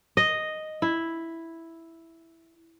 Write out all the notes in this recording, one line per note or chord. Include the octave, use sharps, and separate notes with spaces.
D#5
E4